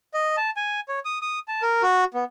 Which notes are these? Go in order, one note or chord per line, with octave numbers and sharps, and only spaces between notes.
D#5
A5
G#5
C#5
D#6
D#6
A5
A#4
F#4
B3